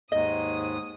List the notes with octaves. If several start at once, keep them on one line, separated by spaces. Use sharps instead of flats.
D#2 G#2 D#5 D#6